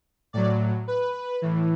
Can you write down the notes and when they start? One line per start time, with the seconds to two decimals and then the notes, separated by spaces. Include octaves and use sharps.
0.33 A2 F#3 D5
0.88 B4
1.42 A2 E3